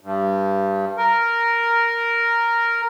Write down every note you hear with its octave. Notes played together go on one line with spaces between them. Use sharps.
G2
A#4